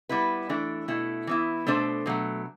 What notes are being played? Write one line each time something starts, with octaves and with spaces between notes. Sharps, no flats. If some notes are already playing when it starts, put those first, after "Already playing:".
G3 B3 E4 B4
E3 A3 D4
B2 A3 E4
E3 B3 E4
B2 A3 D4 A4 C5
B2 F#3 A3